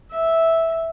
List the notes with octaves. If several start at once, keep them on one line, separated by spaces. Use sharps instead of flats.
E5